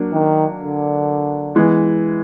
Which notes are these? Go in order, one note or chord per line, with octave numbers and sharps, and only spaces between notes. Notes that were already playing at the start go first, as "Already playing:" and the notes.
Already playing: F#3 A#3 D4
D#3
D3
E3 G#3 B3